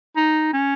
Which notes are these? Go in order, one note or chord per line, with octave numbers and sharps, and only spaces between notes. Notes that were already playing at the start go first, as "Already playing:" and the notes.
D#4
C#4